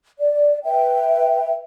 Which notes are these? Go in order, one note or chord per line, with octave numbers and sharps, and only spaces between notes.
D5
B4 E5 G5